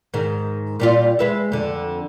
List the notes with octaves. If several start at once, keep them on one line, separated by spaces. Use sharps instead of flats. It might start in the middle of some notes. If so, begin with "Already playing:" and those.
G#2 D#3
A#2 G3 F4
G#3 B4 E5
F2 D3